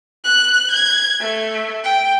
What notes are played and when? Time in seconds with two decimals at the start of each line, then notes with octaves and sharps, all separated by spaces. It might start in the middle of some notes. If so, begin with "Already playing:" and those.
0.25 F#6
0.72 G#6
1.21 A3
1.84 G5